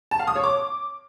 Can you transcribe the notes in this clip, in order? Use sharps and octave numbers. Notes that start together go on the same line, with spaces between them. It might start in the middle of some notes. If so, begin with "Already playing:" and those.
A5
F5
D#6
C#5
D6